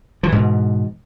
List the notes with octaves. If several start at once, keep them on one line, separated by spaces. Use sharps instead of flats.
G#2 B2 E3 F3